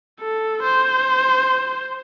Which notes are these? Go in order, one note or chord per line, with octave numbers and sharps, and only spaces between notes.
A4
C5